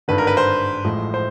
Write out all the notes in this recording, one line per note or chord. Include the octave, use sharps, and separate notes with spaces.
G#1 G2 D3 B4
A#4
B4
C5
A1 A2 F3 G#3
C5